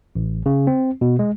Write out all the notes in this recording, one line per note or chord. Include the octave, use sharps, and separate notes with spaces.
A1
C#3
C4
B2
G#3